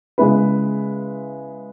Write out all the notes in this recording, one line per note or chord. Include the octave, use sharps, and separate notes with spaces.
C#3 G#3 B3 E4 B4